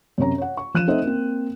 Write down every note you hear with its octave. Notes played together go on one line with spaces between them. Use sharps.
F#2 C3 C#5 A#5
C#5 F#5
C#6
F3 F#6 D#7 E7
A3 C4 D#4 C5 D#5 E5
A#3 C4